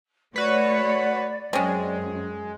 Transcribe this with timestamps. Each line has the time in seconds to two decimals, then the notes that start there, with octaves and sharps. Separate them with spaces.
0.36 A3 F#4 B4 C#5 D5
1.53 F#2 G#3 C4 C#4